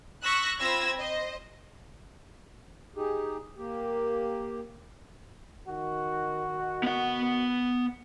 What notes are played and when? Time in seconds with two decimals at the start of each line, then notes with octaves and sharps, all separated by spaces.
0.24 C#6 E6 F#6 A#6 B6
0.59 C4 F4 B5 E6 G#6 A#6
0.95 C5 D#5
2.96 D#4 G4 G#4
3.57 A#3 G4
5.68 D#3 F#4
6.83 B3 F#5